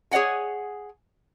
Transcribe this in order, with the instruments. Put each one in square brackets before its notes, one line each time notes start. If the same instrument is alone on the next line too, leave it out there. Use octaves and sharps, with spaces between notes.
[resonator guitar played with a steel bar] G#4 C#5 D#5 F#5 G#5